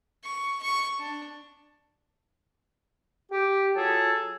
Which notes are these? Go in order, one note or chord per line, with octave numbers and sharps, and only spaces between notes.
C#6
C#6
D4
G4
F#3 F4 G#4 A4